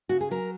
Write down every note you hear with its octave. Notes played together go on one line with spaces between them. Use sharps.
C#3 F#4
G#4
F#3 A#4